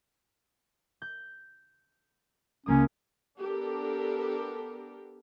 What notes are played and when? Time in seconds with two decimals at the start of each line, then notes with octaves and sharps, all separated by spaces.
1.02 G6
2.66 C#2 A#3 C#4 D#6
3.39 B3 D4 G4 A4 A#4